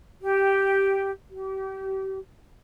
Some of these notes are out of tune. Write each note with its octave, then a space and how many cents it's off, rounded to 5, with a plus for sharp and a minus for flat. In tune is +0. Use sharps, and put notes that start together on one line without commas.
G4 -5
G4 -30